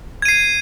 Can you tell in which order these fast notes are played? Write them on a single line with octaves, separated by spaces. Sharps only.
G#6 D#7 C7